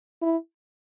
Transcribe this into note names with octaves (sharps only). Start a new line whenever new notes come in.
E4